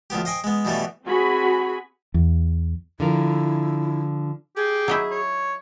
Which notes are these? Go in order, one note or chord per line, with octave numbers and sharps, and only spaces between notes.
D2 F3 B3 G4
C5 D#5 G5 G#5
G#3 B3
B2 E3 G3 A3 B3
C4 F#4 G#4 G#5 B5
E2
D3 F3 E4 A#4
G4 G#4
F#3 D#4 E4
C#5